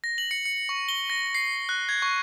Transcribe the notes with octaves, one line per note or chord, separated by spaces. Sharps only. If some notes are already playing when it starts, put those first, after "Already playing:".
A#6
F#7
C#7
C#7
C#6
G7
A#6
C7
F#6
G#6
C#6